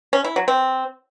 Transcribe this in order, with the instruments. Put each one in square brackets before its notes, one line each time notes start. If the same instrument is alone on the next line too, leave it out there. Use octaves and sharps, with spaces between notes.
[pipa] C#4
E4
F#3
C4